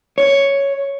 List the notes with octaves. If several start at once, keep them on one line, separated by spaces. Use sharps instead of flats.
C#5